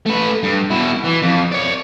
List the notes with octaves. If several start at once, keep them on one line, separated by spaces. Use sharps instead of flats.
A3 B4
G2
B2 E4
E3
F2
C#5 D5